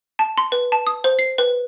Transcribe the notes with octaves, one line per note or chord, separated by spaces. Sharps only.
A5
C6
B4
A5
D#6
C5
C7
B4